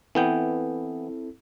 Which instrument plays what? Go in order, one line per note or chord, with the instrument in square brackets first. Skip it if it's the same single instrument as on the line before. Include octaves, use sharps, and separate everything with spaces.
[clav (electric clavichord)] E3 B3 G5 [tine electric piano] C4 E4 A4